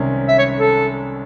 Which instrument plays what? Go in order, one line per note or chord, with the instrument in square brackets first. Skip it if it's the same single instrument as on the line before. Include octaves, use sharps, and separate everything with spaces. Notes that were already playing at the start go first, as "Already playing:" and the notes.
Already playing: [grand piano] C2 C3 D#3 G#3 C#4
[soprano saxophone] E5
C#5
A4